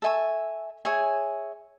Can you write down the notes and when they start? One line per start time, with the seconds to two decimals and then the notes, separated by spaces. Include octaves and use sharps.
0.02 A4 E5 G#5 C#6
0.85 G#4 C#5 E5 G#5